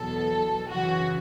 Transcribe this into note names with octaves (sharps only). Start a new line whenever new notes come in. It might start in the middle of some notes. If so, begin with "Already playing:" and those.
Already playing: E2 B2 F#3 A4
F#2 C#3 E3 F#4